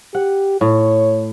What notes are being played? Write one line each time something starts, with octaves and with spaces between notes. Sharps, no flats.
G4 F#5
A2 C#5